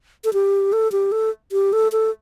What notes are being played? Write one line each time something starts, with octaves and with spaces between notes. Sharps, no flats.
A4
G4
A4
G4
A4
G4
A4
A4